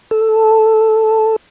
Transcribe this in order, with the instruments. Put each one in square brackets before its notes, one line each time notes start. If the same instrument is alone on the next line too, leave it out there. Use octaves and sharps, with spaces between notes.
[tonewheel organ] A4